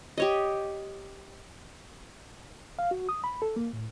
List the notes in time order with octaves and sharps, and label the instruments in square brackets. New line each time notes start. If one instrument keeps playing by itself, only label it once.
[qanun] G4 C#5 D#5
[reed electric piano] F5
F#4
D#6
B5
A4
A#3
A2